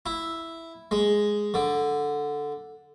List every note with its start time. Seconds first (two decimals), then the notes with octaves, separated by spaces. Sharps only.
0.06 E4
0.91 G#3
1.54 D3